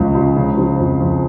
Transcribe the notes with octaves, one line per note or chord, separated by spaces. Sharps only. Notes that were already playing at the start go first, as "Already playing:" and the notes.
Already playing: C#2 C#3 F3
C#2
C#3
F3
F2
F2